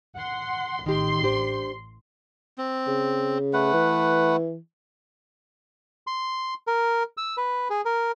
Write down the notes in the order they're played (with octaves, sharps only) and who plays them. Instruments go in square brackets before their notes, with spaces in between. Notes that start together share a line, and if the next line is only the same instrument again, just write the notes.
[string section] F#5 C6
[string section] A1 C6 C7 [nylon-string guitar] D#3 G4
[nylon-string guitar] D4 G4 C5
[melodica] C4
[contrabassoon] C#3
[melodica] A3 B4 F#5
[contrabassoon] E3
[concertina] C6
A#4
E6
B4
G#4
A#4